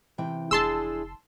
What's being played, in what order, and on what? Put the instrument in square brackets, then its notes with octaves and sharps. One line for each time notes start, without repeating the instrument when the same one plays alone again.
[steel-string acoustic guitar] C3 E3 G5
[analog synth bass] F1 [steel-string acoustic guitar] D4 E4 G#4 [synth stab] A5 C6 E6